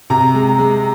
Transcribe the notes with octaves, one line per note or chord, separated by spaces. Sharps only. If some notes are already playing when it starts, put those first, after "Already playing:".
C3 A#5
G#3
G#3